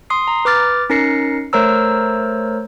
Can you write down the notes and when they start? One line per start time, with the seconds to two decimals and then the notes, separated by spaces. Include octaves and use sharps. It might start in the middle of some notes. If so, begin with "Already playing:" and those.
0.10 C6 D#6 C7
0.28 A#5
0.45 B4 D6 F6 A6
0.90 C#4 D#4 A#4 A#6 C7 C#7
1.53 A3 A#4 C5 C#5 A#5 E6